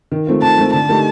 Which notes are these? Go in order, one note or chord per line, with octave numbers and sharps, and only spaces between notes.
D#3
A3 C4 F4
D#3 A5
A3 C4 F4
D3 A5
A3 D#4 G4 A#4